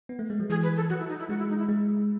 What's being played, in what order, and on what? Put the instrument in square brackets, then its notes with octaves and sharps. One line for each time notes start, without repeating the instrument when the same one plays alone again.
[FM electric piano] B3
A3
G#3
F#3
[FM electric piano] E3 [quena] G#4
[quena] B4
A4
[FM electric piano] F#3 [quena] F#4
[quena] E4
D#4
E4
[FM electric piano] G#3 [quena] F#4
[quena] E4
D#4
E4
[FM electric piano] G#3